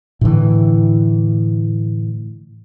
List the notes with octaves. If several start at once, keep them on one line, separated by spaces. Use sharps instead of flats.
A2 D3 E3